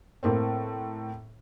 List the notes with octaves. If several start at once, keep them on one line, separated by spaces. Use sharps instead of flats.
A2 A#3 C4